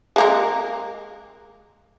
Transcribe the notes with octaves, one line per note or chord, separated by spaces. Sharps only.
G#3 A#3 A#4